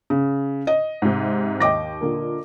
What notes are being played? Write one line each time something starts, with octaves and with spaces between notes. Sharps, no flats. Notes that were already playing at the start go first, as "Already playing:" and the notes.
C#3
D#5
G#2 C3
D#2 D#5 G5 D6 A#6
A#2 D3 A#3